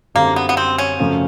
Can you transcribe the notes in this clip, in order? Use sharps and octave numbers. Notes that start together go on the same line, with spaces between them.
F#2 D3 G3 A#3 C4
B3
B3
C4
C#4
F#2 C#3 F3 A3